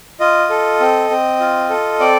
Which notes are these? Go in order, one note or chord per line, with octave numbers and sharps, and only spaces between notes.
F4 D#5
A4
C4
C4
F4
A4
C4 D5